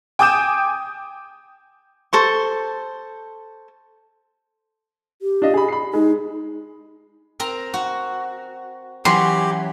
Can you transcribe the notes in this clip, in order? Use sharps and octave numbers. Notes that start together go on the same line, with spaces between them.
G5 G#5 D6 D#6 G6 E7
A4 C5 C#6
G4
D4 F4 D#5
G#4 B5
B5 C7
G#3 D#4
C4 A#4 A#5
F#4
E3 F#3 C#4 G4 C6